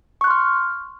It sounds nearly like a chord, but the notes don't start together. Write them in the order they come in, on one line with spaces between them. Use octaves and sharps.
C#6 F#6 C6 F6